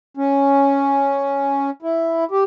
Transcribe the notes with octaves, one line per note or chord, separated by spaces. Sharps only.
C#4
E4
G4